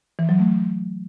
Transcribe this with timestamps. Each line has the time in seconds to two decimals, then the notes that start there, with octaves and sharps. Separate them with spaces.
0.19 E3
0.29 F#3
0.39 A3